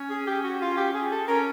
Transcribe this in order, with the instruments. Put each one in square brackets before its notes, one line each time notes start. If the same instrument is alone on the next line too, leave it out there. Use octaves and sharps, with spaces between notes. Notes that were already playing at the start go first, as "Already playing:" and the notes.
Already playing: [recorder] C#4
[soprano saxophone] G#4
G4
F#4
F4
G4
G#4
A4
[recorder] C#4 [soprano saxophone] A#4